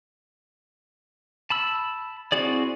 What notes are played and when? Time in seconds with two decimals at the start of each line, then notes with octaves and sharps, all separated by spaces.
1.50 A5 B5 E6
2.32 C4 E4 F#4 G#4 D5